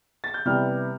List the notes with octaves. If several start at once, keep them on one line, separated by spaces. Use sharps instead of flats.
A6
G6
C3 E3 G3 B3 F6